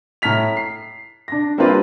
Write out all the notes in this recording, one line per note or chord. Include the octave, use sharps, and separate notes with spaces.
A2 A#5 F6 B6 F7
C7
D4 A#6
G3 A#3 C4 D4 F4 B4